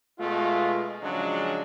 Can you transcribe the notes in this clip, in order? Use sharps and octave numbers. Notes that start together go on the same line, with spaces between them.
B2 G#3 A3 F4
C#3 F3 F#3 G#3 C#4 D4